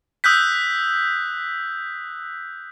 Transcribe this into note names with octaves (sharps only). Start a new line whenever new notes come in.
D#6 E6 F#6 G6 B6